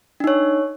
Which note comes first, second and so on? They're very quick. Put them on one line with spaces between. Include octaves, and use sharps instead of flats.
D4 D#4 C#5